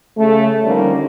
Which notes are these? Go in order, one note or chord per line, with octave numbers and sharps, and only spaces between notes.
C#3 A3
D3 D#3 F3 G3 A#3 C#4